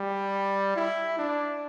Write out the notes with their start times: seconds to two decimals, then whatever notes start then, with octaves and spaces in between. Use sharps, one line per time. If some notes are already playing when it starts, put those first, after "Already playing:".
Already playing: G3
0.76 E4
1.19 D4